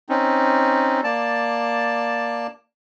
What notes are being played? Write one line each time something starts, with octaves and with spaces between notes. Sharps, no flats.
C4 C#4 D#4
A#3 D5 A5